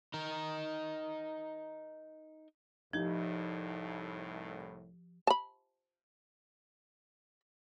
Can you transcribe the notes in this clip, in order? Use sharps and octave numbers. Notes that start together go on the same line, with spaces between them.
D#4 A#4
C2 A2 F3 D#4 G4
A5 B5